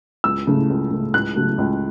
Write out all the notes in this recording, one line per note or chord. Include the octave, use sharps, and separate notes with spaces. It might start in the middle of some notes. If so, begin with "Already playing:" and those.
C#2 E6
C#3 A3
C#2
C#3 A3
C#2 F#6
C#3 F#3 A3
C#2